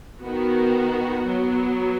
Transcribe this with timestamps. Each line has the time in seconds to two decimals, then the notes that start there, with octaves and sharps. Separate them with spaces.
0.21 D#3 B3 F#4
1.27 F#3 B3